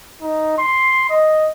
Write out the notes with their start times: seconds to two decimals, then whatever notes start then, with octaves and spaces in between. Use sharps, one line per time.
0.22 D#4
0.58 C6
1.10 D#5